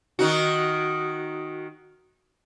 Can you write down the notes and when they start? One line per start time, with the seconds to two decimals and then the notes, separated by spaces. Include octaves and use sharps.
0.19 D#3 D#4 F#4